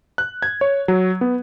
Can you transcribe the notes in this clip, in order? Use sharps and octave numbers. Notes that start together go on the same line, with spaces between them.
F#6
G#6
C#5
F#3
B3